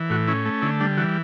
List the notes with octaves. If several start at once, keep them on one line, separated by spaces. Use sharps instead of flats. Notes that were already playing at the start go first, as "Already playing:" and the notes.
Already playing: E3
A2 F#4
C#4 E4
A3
D3 E4
G3 D4
E3 F#4